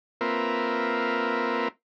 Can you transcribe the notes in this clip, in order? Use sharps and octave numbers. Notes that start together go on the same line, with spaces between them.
A#3 C4 F4 A#4 B4 E5